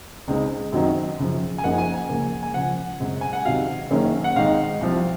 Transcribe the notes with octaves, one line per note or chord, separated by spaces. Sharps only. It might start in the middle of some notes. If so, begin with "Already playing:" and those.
C#2 C#3 G#3 C4 D#4
F#2 D#3 F#3 C4 D#4
F#2 C#3 F3
G#5
F#1 F#2 F3 A#3 D#4 F#5
G#5
G#5
C#2 C#3 F3 A#3
G#5
C#2 C#3 F3 F#5
F#2 C#3 G#3 C4
G#5
F#5
C#2 C3 D#3 F#3 C4 F5
F#1 F#2 D#3 A#3 C#4
F#5
G#1 G#2 D#3 G#3 D#4 F5
C2 C3 F3